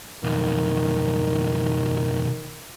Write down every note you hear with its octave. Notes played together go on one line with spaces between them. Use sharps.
B1 F2 D#3